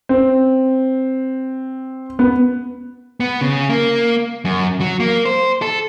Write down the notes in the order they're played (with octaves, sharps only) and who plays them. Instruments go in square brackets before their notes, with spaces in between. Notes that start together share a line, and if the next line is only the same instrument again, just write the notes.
[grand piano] C4
B3
[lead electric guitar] B3
C#3
A#3
F#2
F#3
A#3
C5
A4